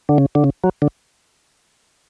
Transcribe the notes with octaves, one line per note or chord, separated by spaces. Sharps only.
D3
C#3
D3
C#3
F#3
D3